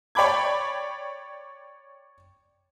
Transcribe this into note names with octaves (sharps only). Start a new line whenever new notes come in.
C#5 D5 G5 B5 D6 G#6